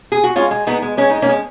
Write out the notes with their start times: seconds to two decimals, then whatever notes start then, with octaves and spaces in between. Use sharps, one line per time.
0.12 G#4
0.24 F#4
0.36 G#3 C#4 F4
0.51 G#3
0.67 G#3 B3 D#4
0.82 G#3
0.97 G#3 C#4
1.10 G#3 D#4
1.22 A#3 C#4
1.29 G#3